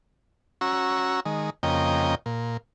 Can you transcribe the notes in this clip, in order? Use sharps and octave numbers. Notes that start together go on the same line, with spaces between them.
C#4 F#4 A#5 E6
D#3 G#3
F2 C#3 A#3 D#5 G5
A#2